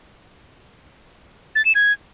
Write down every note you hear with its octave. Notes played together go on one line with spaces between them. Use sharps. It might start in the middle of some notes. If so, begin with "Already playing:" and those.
A6
E7
G#6